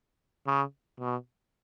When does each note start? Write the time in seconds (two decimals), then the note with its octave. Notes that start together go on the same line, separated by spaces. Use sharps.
0.47 C#3
1.00 B2